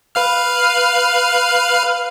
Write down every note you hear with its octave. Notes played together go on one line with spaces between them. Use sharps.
B4 F5 F6